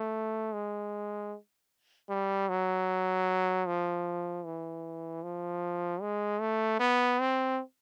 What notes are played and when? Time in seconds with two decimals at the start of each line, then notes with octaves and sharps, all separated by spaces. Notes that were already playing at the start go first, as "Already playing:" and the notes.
Already playing: A3
0.54 G#3
2.10 G3
2.49 F#3
3.67 F3
4.45 E3
5.23 F3
6.02 G#3
6.40 A3
6.80 B3
7.19 C4